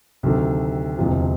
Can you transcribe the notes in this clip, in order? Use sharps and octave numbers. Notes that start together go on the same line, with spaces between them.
D2 C3 D#3 F#3 A3
E1 D2 C3 F3